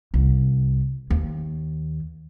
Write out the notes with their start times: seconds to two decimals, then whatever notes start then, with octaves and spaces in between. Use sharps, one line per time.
0.14 C2
1.10 D#2